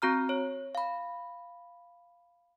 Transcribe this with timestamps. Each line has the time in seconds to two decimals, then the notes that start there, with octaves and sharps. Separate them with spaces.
0.02 C4 F#4 A#5 F6
0.29 C#5
0.75 F5 B5